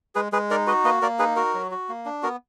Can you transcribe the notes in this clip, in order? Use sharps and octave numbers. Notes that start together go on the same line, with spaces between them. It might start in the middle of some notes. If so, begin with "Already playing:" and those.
G#3 G#4 B4
G#3 G#4 B4
D#4 A#4 D5
F#4 B4 D#5
A#3 B4 D#5
A#3 A#4 D5
D#4 G#4 B4
F#4 A#4
F#3
F#4
A#3
D4
B3 F#4 A#4